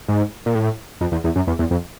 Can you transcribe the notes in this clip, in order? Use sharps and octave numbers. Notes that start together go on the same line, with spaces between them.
G#2
A#2
A2
F2
E2
E2
F#2
E2
E2
F2